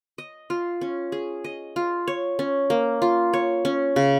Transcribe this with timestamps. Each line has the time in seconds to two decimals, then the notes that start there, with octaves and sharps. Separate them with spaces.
0.18 D#5
0.50 F4
0.81 C#4
1.12 G#4
1.44 D#5
1.76 F4
2.08 C#5
2.39 C#4
2.70 A#3
3.02 F4
3.33 C#5
3.65 C#4
3.96 C#3